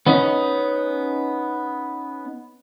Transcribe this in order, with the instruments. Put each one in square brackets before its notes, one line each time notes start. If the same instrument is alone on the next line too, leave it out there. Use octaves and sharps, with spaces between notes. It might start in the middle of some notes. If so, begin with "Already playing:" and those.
[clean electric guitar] B3 C#4 D#4